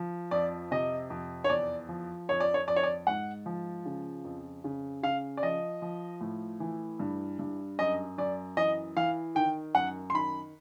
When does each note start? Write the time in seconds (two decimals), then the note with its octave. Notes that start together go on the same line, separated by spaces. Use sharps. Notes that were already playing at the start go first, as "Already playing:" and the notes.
Already playing: F3
0.31 F2 D5
0.71 C3 D#5
1.10 F2
1.44 C#5
1.49 E2 D5
1.89 F3
2.29 F2 C#5
2.40 D5
2.54 C#5
2.67 F2 D5
2.76 C#5
2.83 D5
3.07 G#2 F#5
3.46 F3
3.85 C#3
4.24 F2
4.64 C#3
5.03 C#3 F5
5.37 D5
5.43 F3 D#5
5.82 F3
6.21 A2
6.60 E3
6.99 G2
7.39 G2
7.79 F#2 D#5
8.18 F#2 D5
8.57 E3 D#5
8.97 E3 F5
9.35 D#3 G5
9.75 F#2 F#5
10.10 C6
10.14 D#3 B5